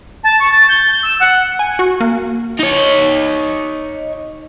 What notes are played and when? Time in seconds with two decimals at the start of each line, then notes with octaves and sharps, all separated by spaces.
0.23 A5
0.39 C#6
0.52 A6
0.69 G6
1.03 E6
1.20 F#5
1.59 G#5
1.79 F#4
2.00 A#3
2.59 D#4 C#5